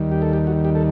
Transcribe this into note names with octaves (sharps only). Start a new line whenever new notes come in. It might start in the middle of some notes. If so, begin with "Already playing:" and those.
Already playing: D#2 D#3 G3
G4
A4
G4
F#4
G4
A4